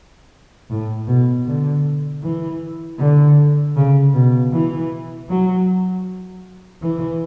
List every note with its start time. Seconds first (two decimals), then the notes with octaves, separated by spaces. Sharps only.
0.70 A2
1.07 B2
1.46 D3
2.23 E3
2.99 D3
3.76 C#3
4.14 B2
4.53 E3
5.29 F#3
6.82 E3